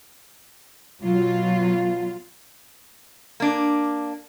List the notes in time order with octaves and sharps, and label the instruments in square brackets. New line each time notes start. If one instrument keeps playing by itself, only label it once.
[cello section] B2 F#3 F4
[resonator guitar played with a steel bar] A#3 D4